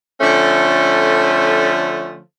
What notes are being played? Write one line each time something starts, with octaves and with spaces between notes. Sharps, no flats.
D3 F3 A3 C#4